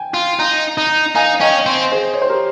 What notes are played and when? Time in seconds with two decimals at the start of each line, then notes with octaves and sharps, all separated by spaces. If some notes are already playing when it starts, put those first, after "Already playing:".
Already playing: G5 G#5
0.14 F4
0.40 D#4
0.78 D#4
1.15 D#4 F5 G#5
1.40 C#4 D#5 G5
1.66 C4
1.92 G#4 C5
2.14 C#5
2.22 C5
2.29 G4 A#4